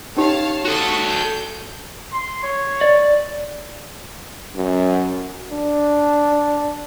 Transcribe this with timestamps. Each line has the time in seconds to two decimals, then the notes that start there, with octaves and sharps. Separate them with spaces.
0.17 C#4 D#4 G4 C#5 F5 A5
0.65 F#4 A4 C#6 D#6
1.05 G6
2.13 C6
2.43 C#5
2.81 D5
4.56 F#2
5.52 D4